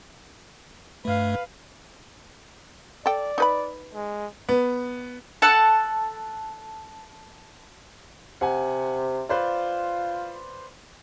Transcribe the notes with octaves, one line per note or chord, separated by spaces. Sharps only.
G2 A3 B4 F5
A4 D5 G5
D#4 B4 B5
G#3
B3
A4 F#5 A5
C3 F#5 G#5
F4 B4 C5 D5